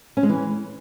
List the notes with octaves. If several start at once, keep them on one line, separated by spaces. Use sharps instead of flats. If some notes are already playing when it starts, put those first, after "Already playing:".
C#4
G#3
E3